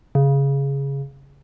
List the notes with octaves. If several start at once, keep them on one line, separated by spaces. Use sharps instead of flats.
C#3